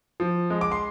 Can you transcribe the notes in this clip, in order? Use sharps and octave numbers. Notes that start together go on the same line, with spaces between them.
F3
G#3
D6
C6